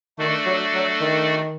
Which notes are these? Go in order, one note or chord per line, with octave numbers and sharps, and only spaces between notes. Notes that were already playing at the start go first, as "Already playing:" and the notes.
D#3 A3 D4 F#4 A4 D5
F#3
F#3
D#3